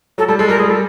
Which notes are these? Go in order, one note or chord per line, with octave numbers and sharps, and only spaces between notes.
F#3 A4
G3 A4
G#3 A4
G3 A#4
G3 G#4
G3 A4